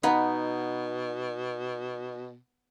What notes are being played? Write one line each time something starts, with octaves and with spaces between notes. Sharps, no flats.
B2 B3 D#4